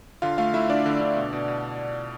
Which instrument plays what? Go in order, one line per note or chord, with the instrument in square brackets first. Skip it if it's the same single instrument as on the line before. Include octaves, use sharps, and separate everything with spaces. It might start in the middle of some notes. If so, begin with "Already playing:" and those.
[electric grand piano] D3 F4 F5
A3 F4 F5
A3 E4 E5
D3 D4 D5
D3
D3
B2
B2
B2